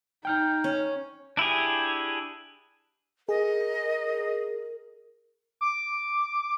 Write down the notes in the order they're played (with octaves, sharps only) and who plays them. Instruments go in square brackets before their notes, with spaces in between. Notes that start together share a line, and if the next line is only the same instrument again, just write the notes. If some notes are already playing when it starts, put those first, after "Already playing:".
[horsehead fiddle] D#4 [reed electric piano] G5 F6 G6
[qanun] C#4
[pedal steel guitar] D4 E4 G4 G#4
[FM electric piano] G#4 [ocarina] A#4 [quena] D#5
[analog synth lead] D6